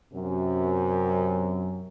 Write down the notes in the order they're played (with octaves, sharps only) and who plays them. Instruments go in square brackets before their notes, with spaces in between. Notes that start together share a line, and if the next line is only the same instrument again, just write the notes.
[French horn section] F#2 C3